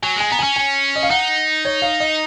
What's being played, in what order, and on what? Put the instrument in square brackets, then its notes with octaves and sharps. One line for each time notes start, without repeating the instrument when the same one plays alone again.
[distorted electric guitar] F#3 [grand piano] G#5
[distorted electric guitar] G#3 [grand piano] G#5
[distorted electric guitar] B3 [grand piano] A#5
[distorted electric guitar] C#4 [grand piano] G#5
[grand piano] G#5
D#5
F5
[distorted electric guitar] D#4 [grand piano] F#5
[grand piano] C#5
F5
D#5